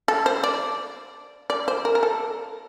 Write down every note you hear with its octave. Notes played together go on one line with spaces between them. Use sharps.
A4
C5
D5
D5
C5
A#4
A#4
A4